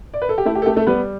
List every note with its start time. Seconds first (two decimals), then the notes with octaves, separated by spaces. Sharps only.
0.14 D5
0.22 B4
0.29 A4
0.38 G4
0.45 A3 E4
0.55 G4
0.62 A4
0.66 A3 G4
0.76 A3 A4
0.87 G3 B3 B4